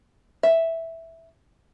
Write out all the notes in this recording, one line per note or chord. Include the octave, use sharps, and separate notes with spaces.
E5